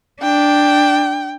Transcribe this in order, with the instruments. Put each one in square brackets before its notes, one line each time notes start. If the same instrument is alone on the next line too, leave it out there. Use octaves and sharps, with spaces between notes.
[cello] D4 [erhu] G5